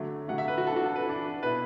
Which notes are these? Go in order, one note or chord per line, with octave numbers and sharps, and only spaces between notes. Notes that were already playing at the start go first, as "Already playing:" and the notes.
Already playing: D3 F#3 A3
D3 F#3 A3 F#5
E5
B4
F#4
E3 D4 F#4 A4
A4
B4
E3 D4
B2 B3 E4 B4